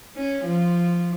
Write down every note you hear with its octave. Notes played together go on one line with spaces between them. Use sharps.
C#4
F3